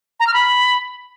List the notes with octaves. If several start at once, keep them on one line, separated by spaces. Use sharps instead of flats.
A#5
F6
B5